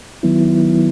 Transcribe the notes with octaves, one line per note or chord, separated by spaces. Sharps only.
D#3 F#3 B3 E4